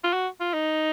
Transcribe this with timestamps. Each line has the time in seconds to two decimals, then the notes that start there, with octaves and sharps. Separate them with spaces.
0.04 F4
0.13 F#4
0.40 F4
0.54 D#4